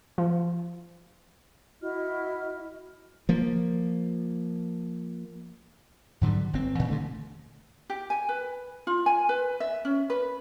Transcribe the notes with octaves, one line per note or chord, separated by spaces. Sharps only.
F3
E4 F#4 D#5 F6
F3 A#3
G#2 D3 F#3 G3
G1 C4
A#2 E3
G2 D3 A3 C4
G4
G#5
B4
F4
G#5
B4
E5
C#4
B4